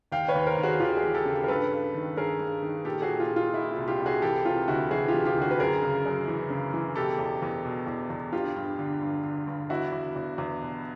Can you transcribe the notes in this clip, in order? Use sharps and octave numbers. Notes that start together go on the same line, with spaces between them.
D#2 F5 G5
B4 C#5
D#2
A#4 C5
D#2
F#4 G#4
D#2 F4 G4
F#4 G#4
E3
G4 A4
C#3
A#4
G2 A4 B4
G2
D#3
G2 G#4 A#4
G2
D#3
A#2 G4 A4
F#4 G#4
A#2
F4
A#2
F4
A#2 E4
F4
C2
F4 G4
C2
F#4 G#4
E3 G4 A4
C3 F4
D2 E4 F#4
E3 F#4 G#4
F4 G4
E3
F4 G4
D2
F#4 G#4
B4
F#2 G#4 A#4
C#3
F#2
E3
C#3
E3
B2 G4 A4
E2
E2
B2
E2
E2
G2 F4 G4
G2
D3
G2
D3
G2
E2 E4 F#4
E2
E2
E2
B2